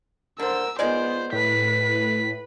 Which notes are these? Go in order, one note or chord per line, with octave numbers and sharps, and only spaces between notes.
D3 A#4 C5 E6
D#3 G#3 B3 F4 C5 D5
A2 B4 B6